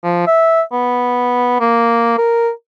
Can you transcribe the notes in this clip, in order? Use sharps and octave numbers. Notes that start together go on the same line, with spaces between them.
F3
E5
B3
A#3
A#4